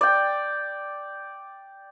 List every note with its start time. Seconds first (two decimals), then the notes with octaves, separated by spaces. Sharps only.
0.01 D5 G5